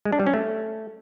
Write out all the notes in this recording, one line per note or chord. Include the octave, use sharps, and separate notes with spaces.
G#3
D4
G3
C#4
A3